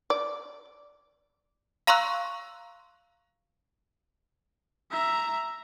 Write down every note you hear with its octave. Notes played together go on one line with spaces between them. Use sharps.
D5
F5 A#5 C6 C#6 E6 F#6
E5 A#5